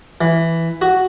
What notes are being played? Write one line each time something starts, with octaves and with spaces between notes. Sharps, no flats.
E3
F#4